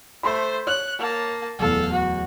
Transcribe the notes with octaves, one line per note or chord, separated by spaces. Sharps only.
A3 C5 B5 C6
C#5 F#6
A#3 A5
D1 E2 A4 F5
F#4